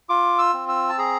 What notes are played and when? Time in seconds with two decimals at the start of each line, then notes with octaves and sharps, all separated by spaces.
0.09 F4 D6
0.39 E6
0.54 C4
0.69 E6
0.89 A5
0.98 G#4 A#5